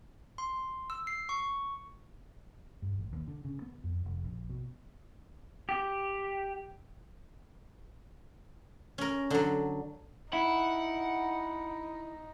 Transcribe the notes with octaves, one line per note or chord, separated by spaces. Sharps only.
C6
E6
C7
C#6
G2
A1
D#2
D3
C#3
B3
F2
F1
A#1
B2
G4
C#4 A#4
D3 F#3
D#4 E4 F#5